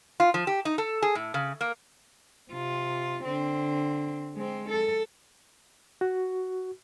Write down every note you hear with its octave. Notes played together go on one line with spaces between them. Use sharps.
F4
F3
G4
D#4
A4
G#4
A2
C#3
A#3
C3 F4
D3 C4
G#3 C4
A4
F#4